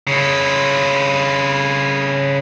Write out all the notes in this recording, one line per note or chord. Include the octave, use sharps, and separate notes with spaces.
C#3 E4